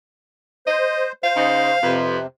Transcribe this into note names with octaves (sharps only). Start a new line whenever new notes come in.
C5 D#5
C5 F5
C#3 D#4
F2 C3 B4